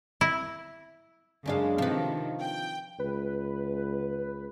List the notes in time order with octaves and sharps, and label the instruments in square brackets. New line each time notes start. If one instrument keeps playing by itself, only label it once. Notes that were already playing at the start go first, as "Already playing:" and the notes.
[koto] E4
[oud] F#2 D4 F5 [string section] C#3 G#3
[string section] C3 D#3 [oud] F3 B4
[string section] G5
[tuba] C#2 [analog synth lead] B4